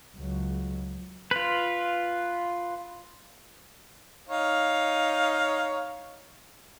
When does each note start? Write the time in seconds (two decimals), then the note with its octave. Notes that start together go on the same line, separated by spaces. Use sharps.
0.16 C#2 F#3
1.31 F4 B4
4.29 D#4 C#5 F5